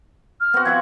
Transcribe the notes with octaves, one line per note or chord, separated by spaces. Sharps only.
F6
B3 C4 F#4
F3 E5 F#5 G#6